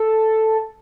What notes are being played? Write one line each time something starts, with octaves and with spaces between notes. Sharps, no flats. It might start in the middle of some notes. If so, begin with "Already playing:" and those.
Already playing: A4